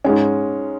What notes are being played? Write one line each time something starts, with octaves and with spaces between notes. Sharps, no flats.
G#2 G#3 C#4